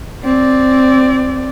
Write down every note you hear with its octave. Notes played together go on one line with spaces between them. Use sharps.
C4 D5